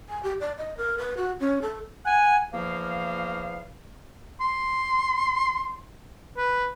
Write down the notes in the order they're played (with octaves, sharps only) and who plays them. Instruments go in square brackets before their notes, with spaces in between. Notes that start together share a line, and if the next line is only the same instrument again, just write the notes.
[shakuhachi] G#5
G4
D5
D#5
A#4
B4
F#4
C#4
A4
[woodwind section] F#5 G#5
E2 F3 A#3 F5
[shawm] C6
B4